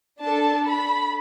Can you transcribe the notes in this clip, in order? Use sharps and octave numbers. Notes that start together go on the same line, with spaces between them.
D4 A4 A5
B5